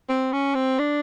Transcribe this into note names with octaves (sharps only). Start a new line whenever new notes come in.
C4
C#4
C4
D4